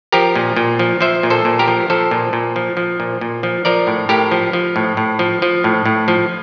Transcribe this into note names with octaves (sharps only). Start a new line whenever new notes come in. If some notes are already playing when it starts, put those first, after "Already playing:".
F3 G4 A#4
A#2
A#2
F3
F3 C5 E5
A#2
A4 C5
A#2
G4 A#4
F3
F3 A4 C5
A#2
A#2
F3
F3
A#2
A#2
F3
F3 A#4 D5
A2
A2 G4 A#4
F3
F3
A2
A2
F3
F3
A2
A2
F3